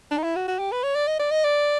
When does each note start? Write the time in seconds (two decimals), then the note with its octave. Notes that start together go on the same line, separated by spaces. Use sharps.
0.11 D4
0.18 D#4
0.23 E4
0.36 F#4
0.48 F#4
0.59 G4
0.72 B4
0.83 C#5
0.95 D5
1.07 D#5
1.19 D5
1.31 D#5
1.44 D5